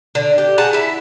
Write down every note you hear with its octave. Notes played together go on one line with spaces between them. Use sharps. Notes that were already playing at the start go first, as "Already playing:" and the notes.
D3
G4
G#4 F#5 A5 A#5
E4 E5